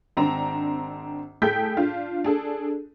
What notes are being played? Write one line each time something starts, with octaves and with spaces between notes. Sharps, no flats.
G#1 C4 D4 A#5
A2 G#4 A4 G5 G6 B6
D4 F4
D4 G#4 A4